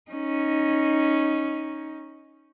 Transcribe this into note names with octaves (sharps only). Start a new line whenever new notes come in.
C#4 D#4